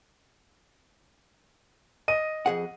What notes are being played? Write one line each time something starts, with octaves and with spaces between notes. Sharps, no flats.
D#5 D#7
F2 G#4 F#5